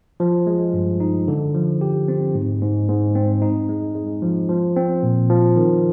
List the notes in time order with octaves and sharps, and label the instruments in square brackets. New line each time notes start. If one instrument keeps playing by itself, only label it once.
[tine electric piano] F3
G#3
G2
D#4
D3
F3
G4
C4
G#2
G#2
G#2
C4
D#4
G#3
G#3
F3
F3
C4
A#2
F3
D#3